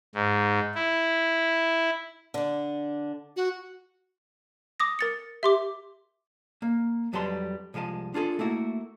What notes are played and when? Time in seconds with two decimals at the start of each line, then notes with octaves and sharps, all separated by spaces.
0.15 G#2
0.75 E4
2.34 D3 D4
3.36 F#4
4.80 D6 D#6 A#6
4.99 A#4 A6 C#7
5.43 G4 E5 C6 D6
6.62 A#3
7.13 F2 F#3 G3 B4 A5 C6
7.74 C2 F3 G#3 G#5 A5
8.14 D4 F4 G#4 A4
8.39 A3 A#3 E4 F#4